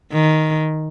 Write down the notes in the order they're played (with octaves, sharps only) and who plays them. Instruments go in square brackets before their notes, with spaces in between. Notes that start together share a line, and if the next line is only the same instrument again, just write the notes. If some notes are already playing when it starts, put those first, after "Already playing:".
[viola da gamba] D#3